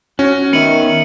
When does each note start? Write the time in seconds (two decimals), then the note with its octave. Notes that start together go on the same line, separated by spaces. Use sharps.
0.19 C#4 F#4
0.53 D#3 B3 E5 C#7 D#7 F#7